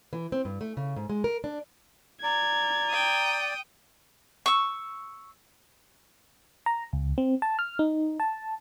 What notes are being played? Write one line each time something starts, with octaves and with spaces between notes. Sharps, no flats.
E3
C4
G2
A3
C#3
G#2
G#3
A#4
D4
D5 A#5 G#6
G5 D#6
C#6 E6
A#5
C#2
C4
A5
F6
D#4
A5